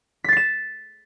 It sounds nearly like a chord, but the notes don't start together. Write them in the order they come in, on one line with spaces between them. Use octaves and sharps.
B6 A6 C7 E7